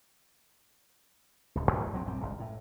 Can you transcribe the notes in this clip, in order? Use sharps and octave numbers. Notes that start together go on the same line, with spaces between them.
D1 C#2
A#1 G#2 E3 F3
F#3 G#3 C4
A#1 F#2 G3 C4
G1 C#2
A2